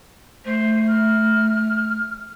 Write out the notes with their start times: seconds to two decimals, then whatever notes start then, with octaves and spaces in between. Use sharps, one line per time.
0.45 A3 C5
0.88 F6